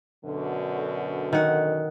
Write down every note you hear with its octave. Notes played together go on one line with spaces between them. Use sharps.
F#2 B2 D3
D#3 F#5